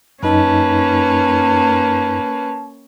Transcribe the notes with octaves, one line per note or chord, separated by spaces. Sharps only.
F#2 A#3 C#4 D#4 B4 A5